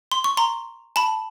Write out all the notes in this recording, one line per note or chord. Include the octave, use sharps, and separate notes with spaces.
C6
C#6
A#5 C6
A5 B5